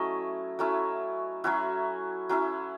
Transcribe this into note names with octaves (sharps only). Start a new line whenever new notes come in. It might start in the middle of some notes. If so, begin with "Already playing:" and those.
Already playing: F#3 A3 C#4 E4 D#5
F#3 A3 C#4 E4
F#3 C#4 E4 F#4
F#3 C#4 E4